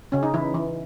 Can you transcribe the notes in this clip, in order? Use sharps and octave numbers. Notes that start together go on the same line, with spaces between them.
C#3 C#4
D#4
E3 E4
E3